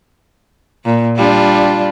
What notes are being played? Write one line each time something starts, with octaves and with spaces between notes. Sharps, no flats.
A#2
G3 D4 F4